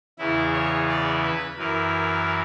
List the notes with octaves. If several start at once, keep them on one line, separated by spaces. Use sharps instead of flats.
E2 C#3 E3 E4
C#5
D5
B4
F#2 E3 A#4